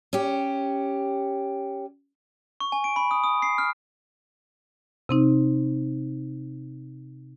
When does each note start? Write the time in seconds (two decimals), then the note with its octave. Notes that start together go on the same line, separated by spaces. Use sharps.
0.13 C#4 G4
2.60 C#6
2.72 G#5
2.84 D7
2.96 B5
3.11 D#6
3.24 D#6
3.42 C7
3.58 F6
5.09 C3 C4 D#4